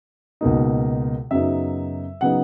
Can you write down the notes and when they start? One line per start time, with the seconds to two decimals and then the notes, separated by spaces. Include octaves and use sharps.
0.41 C#2 B2 A#3 D#4
1.31 F#2 C#3 F#3 B3 D#4 E5
2.21 C#3 F#3 B3 D#4 F#5